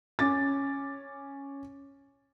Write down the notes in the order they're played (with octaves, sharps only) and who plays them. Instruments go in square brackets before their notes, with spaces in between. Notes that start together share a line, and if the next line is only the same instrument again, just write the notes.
[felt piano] C#4 D6 A6